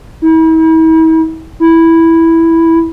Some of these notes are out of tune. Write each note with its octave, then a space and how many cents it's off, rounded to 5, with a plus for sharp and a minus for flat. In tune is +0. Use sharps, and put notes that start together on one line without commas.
E4 -40
E4 -5